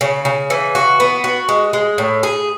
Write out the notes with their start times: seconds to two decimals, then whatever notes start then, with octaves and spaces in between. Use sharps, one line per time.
0.01 C#3
0.25 C#3
0.50 E3
0.75 F#4
1.00 B3
1.24 F#4
1.49 G#3
1.73 G#3
1.98 A2
2.23 G#4